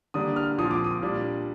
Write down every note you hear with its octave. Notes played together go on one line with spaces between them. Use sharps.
D3 G3 A#3 D4 D#6
F6
A#2 F3 C4 D#6
D6
D#6
A#2 G3 D4